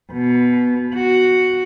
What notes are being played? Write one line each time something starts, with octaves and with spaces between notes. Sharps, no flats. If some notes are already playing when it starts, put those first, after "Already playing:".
B2
F#4